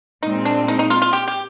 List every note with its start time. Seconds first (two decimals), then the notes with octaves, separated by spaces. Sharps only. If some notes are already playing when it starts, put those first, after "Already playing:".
0.23 A#2 G#3 C4 D#4
0.45 D4
0.68 D#4
0.79 D#4
0.90 F4
1.02 F4
1.13 G4
1.28 G4